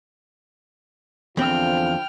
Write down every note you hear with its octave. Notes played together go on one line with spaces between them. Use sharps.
E2 D3 F3 C4 G5 F6